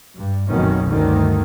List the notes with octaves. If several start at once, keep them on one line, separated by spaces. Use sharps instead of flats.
G2
F1 B1 F#2 B2 D#3 C#4
D2 G2 D3 D#3